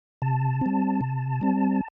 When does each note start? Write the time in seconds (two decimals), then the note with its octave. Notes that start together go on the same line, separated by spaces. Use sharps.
0.22 C3 A5
0.61 G3 C4
1.01 C3
1.41 G3 C4